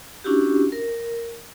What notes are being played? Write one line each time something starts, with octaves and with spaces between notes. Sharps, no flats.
C#4 D4 E4 F#4 G4
A#4